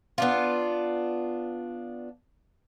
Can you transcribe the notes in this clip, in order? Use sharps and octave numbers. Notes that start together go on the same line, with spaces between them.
B3 D4 F4